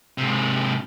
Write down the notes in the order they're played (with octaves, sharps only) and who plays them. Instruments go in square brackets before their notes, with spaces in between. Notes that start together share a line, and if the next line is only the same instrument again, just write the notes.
[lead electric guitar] G#2 C3